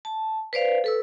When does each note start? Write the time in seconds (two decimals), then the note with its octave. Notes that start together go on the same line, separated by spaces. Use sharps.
0.05 A5
0.53 B4 C5 D5 F5
0.84 A4 B4 E6